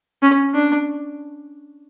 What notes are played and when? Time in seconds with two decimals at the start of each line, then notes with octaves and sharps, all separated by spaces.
0.23 C#4
0.54 D4